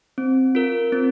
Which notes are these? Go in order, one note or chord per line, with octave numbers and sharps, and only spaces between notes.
C4
F4 A#4
C4